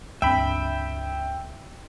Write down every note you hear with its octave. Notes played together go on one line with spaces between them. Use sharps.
C#2 G2 C4 E5 G5 B5